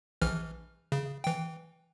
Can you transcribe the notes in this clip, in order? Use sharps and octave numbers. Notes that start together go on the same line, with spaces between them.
A#1 E3 F6
C#3
E3 G5